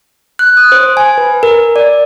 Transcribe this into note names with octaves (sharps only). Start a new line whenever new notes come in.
F#6
D#6
C5
G#5
B4
A#4
D5